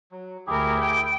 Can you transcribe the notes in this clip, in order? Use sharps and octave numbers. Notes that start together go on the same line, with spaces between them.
F#3
D2 E4 G4 G#4 A#4
G5